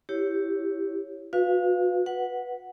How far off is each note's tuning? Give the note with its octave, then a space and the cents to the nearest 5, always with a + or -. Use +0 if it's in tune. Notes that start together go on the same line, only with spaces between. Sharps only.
E4 +0 G4 +0 C#5 +0
F#4 -40 B4 +0 F5 +0
B4 -5 F#5 +0